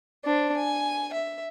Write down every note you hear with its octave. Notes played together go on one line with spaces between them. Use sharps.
D4 C5
G#5
E5